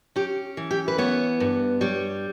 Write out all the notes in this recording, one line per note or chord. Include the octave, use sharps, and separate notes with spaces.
C#4 G4
E3
G4
B4
B3 C#5
G2
G3 C#5